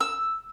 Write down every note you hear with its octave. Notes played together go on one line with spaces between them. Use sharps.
E6